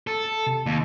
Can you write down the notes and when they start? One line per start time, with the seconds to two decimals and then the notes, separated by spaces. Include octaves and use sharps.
0.07 A4
0.47 C3
0.66 D#2